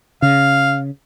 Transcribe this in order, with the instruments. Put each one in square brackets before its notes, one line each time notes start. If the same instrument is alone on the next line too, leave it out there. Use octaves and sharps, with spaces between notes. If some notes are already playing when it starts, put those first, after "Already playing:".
[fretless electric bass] C#3 [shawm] F5